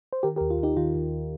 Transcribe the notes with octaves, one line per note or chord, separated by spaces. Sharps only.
C5
D#3 G4 A#4
G4 A#4
D#2
F4
D#2 D#4 G4
D#3 F4
D#2